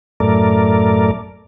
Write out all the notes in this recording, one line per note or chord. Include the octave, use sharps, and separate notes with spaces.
F#2 A2 A3 A#4 D5